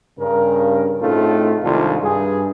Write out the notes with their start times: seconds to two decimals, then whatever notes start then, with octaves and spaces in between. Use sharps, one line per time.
0.19 G2 C#3 A#4
1.01 A2 C#3 A3 C4 D#4 F4
1.63 C2 G#2 D#3 D4 F4 A4
2.03 G2 G#4